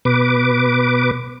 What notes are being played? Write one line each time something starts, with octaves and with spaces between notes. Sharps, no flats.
B2 B4 D6